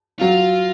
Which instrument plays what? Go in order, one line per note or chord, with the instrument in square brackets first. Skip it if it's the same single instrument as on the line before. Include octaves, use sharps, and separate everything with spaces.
[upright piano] F#3 [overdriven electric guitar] F4